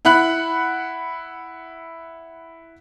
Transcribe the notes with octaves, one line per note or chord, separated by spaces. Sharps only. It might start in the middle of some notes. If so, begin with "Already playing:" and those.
E4 F#5 B5 F#6 F#7